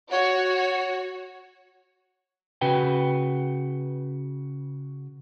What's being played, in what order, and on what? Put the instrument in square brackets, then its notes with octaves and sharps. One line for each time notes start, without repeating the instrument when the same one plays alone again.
[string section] F#4 [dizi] C#5
[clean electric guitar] C#3 F#4 B4 G5